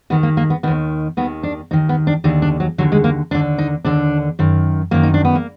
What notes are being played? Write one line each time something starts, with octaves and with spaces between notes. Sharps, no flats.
D#2 D#3 B3
A#3
A#3
B3
D#2 D#3 B3
D#2 D#3 B3
D4
D#2 D#3 D#4
B3
D4
D#2 D3 D#4
D4
F#3
D#2 D3 F#3
G#3
A#3
D#2 D3 D4
D#4
D#2 D3 D4
F#2 D#3
F#2 D#3 A#3
D#4
D4
B3
A#3